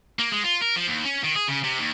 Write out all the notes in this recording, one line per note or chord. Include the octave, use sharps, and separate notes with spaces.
A#3
G#3
F4
A#4
F3
D#2
C#4
D#3
G#4
C#3
C3
D#2